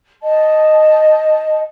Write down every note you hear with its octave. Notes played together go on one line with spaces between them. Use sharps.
D#5 A5